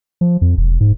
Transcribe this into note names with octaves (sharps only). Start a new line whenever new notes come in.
F3
F2
E1
G#2